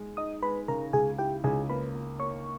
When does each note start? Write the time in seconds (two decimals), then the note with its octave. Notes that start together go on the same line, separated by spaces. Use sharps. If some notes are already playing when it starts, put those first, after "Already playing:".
Already playing: G#3
0.17 D#4 D#5 D#6
0.42 G#3 B4 B5
0.68 C#3 A#4 A#5
0.93 C#2 G#4 G#5
1.19 E4 G4 G5
1.44 C#2 G#4 G#5
1.70 A#3 B4 B5
1.95 A#3
2.19 A#3 C#5 C#6